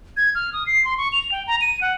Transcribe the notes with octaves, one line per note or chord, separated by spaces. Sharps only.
G#6
F6
D#6
C7
C6
C#6
F7
G5
A#5
D#7
F#5